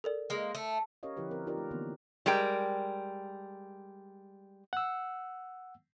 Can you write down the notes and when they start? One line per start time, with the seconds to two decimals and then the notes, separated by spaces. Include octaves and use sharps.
0.04 A4 A#4 D5
0.30 G#3 A#3
0.55 A3
1.03 C#4 G4 A#4 C#5 D#5 F5
1.17 D3 F3 E4 G4 B4
1.31 C4 A#4
1.47 D#4 F4 G4 A#4 B4 D5
1.58 A3
1.71 D3 E3 A#3 B3
2.26 G3 G#3 A#4 G5
4.73 F#5 E6